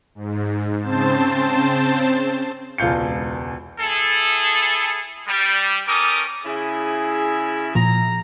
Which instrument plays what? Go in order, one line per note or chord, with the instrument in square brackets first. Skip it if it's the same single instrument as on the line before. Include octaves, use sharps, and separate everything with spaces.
[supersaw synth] G#2
C#3 C4 C5 A5
[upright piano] E1 C#2 F5 G6 C#7
[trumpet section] E4 G#4 A4
G3
C#4 G4 A4 A#4 D6 D#6
[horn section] C#3 E4 [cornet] G#4
[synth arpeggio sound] A#2 F3 [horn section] A#5